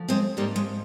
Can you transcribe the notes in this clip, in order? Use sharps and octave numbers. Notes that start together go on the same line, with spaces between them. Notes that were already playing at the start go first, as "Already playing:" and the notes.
Already playing: D2 F3
G#3 C4
G#2 F3 G3 A#3
G#3